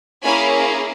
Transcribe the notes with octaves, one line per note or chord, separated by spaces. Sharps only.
A#3 C#4 E4 G#4 G#5 B5